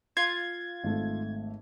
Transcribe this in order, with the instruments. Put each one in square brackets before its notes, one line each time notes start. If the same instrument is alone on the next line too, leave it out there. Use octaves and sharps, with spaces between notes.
[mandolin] F4 [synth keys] G#6
[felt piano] G#1 A3